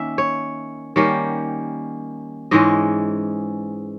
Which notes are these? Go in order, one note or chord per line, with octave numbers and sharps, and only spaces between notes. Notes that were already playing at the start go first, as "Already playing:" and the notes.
Already playing: D#3 A#3 C#4 E5
C#5
D#3 G3 A#3 C#4 C#5
G#2 E3 G#3 C#4 D#5